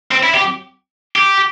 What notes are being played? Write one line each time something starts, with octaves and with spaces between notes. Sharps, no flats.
C4
E4
G4
G4